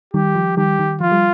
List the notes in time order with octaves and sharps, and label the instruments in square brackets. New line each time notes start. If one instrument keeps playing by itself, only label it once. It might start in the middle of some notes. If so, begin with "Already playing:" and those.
[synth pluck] D#3 G3 [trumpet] G4
[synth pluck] F3
[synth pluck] D#3 G3 [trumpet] G4
[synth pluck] D#3
[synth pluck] F3 [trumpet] F4
[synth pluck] G3